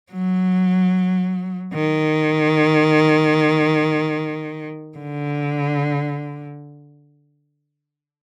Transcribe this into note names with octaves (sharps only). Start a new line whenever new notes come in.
F#3
D#3
D3